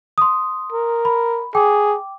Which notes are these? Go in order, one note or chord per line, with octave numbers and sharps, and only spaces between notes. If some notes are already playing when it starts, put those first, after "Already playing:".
C6 D#6
A#4
B5
G#4 G5 D6